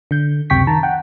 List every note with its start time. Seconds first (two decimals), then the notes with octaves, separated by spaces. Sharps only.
0.11 D3 G6
0.50 C#2 F#2 C3 G5 C#6 B6
0.67 D#3 A5 A#5
0.83 F#5 G5